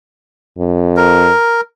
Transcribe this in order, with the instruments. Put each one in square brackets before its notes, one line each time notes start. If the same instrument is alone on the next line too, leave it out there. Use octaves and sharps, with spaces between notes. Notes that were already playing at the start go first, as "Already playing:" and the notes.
[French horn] F2
[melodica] A#4